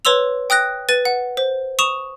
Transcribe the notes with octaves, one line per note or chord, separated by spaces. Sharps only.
B4 C#5 C6 E6 F7
G5 D#6 F#6 A#6
B4 A6 D#7
F#5
C5
C#6 D#6 E7 F7